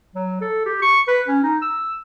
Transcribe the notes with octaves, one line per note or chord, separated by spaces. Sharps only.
F#3
A4
G4
C#6
B4
C#4
D#4
E6